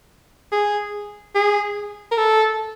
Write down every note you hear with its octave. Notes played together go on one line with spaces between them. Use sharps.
G#4
G#4
A#4
A4